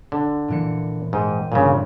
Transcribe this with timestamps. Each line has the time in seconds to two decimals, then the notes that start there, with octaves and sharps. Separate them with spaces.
0.12 D3
0.48 A#2 E3 C#7
1.13 G#2 G5 D#7
1.52 G1 A#2 C#3 C5